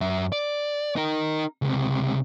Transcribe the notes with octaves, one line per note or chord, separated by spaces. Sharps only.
F#2 E5
D5
D#4 A#4
C#2 C3